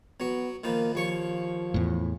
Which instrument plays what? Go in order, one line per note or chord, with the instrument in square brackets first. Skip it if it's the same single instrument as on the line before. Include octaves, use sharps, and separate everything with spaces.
[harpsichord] F#3 F#4 [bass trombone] B3
[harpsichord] D#3 F3 B4 [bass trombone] A#3
[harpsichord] D#2 C#5 C#6 [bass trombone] F3
[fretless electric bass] E2 A2